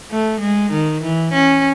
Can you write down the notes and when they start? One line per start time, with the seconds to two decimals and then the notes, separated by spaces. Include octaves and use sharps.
0.11 A3
0.41 G#3
0.71 D#3
1.03 E3
1.33 C#4